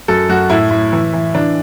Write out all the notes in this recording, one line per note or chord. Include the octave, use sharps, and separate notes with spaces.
F#2 A4
F#2 F#4
A2 E4
A2
E3
E3
E3 D4